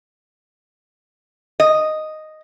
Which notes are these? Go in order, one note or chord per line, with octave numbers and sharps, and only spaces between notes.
D#5